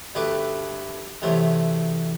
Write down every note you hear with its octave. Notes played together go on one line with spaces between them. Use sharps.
D2 G2 A3 B4 D6
E2 C3 F#3 A3